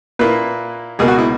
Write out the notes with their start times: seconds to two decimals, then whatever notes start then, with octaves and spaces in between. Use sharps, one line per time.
0.19 A#2 A#3 E4 B4
0.99 C#2 B2 A#3 G#4
1.08 F#4
1.19 E4